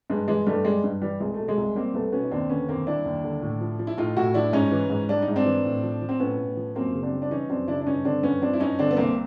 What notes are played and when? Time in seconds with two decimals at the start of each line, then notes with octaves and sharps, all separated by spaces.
0.10 G2 G#3
0.28 E3 G#3
0.47 G2 G3 A3
0.65 G3 G#3
0.84 G2
1.02 E3 G3
1.20 C2 G#3
1.34 B2 A3
1.48 G#3
1.58 C2
1.75 G3 A#3 C4
1.94 C2 A3 B3
2.12 B2 B3 C#4
2.23 D#4
2.31 D#2 C4 D4
2.50 D3 B3 C#4
2.69 D#2 A#3 C4
2.87 G3 D4 E4
3.06 D#2
3.24 D3
3.42 A2
3.61 F3
3.79 F3
3.87 E4
3.97 A2 D#4 F4
4.17 A2 E4 F#4
4.34 F3 D4 E4
4.53 G#2 C#4 D#4
4.71 E3
4.90 G#2
5.09 G3 D4
5.22 D#4
5.28 G#2
5.36 C4 D4
5.45 E3
5.65 A2
5.83 F3
6.02 F3
6.09 C4
6.19 A2 B3 C#4
6.38 A2
6.57 F3
6.75 F#2 A#3 C4
6.93 C#3
7.03 C4 D4
7.13 G3
7.22 D4
7.31 E3 C#4 D#4
7.49 F#2 C4 D4
7.68 C#3 D4 E4
7.81 D4
7.86 G2 C#4 D#4
8.05 D3 C4 D4
8.23 G2 B3 C#4
8.42 F3 C4 D4
8.53 E4
8.60 G2 C#4 D#4
8.79 D3 C4 D4
8.91 B3
8.97 C2 A#3 C4